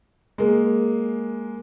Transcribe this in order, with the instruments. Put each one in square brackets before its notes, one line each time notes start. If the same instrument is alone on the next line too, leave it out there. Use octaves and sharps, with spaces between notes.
[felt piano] G#3 A#3